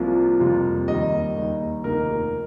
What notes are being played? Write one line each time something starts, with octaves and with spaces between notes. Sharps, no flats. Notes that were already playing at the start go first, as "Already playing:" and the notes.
Already playing: C2 C3 F3 A#3 F4
F2 C3 G3 A#3 F4
D#2 D#3 G3 D#5
D#2 D#3 G3 D#4
F1 D#2 D#3 A#3 D#4 A#4